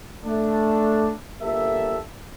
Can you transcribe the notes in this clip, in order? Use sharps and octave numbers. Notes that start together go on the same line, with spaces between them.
A3 D4
G1 A#3 G4 A4 E5